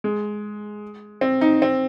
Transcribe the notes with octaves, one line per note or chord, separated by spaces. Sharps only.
G#3
C4
D#4
C4